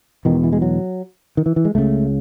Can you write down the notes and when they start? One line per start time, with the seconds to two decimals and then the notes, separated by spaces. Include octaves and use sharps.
0.25 E1 E2 B2 D#3
0.44 E3
0.53 G#3
0.62 F#3
1.37 D#3
1.46 E3
1.56 E3
1.65 G#3
1.75 C#2 C#3 A3